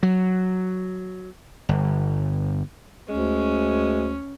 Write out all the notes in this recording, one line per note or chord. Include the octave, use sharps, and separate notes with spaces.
F#3
G1
D2 G#3 C#4